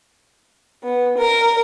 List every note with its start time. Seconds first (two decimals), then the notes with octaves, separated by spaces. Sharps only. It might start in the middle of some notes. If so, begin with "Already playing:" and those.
0.83 B3
1.18 A#4